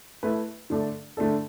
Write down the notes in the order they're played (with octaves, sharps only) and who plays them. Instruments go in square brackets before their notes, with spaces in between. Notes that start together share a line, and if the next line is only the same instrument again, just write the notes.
[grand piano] A3 E4 B4
D3 A3 D4 A4
D3 A3 D4 A4